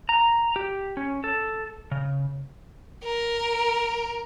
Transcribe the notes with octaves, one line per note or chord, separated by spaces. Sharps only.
A#5
G4
C#4
A4
C#3
A#4